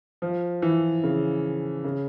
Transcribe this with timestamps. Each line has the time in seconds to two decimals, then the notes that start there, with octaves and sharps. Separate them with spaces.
0.22 F3
0.62 E3
1.04 C#3
1.84 C#3